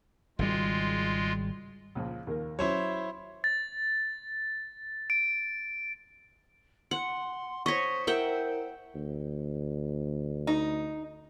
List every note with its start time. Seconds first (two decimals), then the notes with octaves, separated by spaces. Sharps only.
0.39 G#1 C#3 G3 G#3 F4
1.95 C#2 A#2 F3
2.27 D#2 A#3 A#4
2.59 F#3 C#4 E4 C5 C#5
3.44 A6
5.10 D7
6.91 F#5 C6 C#7
7.66 C5 C#5 D#5 C#6 B6
8.07 E4 A#4 E5 F#5 G5
8.95 D2
10.47 D#4